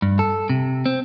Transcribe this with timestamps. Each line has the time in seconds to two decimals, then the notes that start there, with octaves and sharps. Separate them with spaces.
0.02 G2
0.19 A4
0.50 C3
0.86 C4